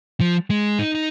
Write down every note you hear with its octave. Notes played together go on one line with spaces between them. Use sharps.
F3
G#3
D#4
D#4